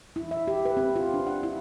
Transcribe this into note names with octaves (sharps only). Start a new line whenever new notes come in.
E4
E5
G4
B4
C4
F4
D4
F#5
E4